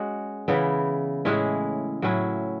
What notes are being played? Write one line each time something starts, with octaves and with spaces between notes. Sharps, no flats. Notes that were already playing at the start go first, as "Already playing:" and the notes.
Already playing: G#3 C#4 F#4
C#3 E3 B3 E4
A2 G#3 C#4 E4
A2 F#3 C#4 E4